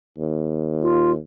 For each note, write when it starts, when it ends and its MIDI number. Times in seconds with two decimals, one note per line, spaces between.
0.18 1.18 39
0.83 1.12 65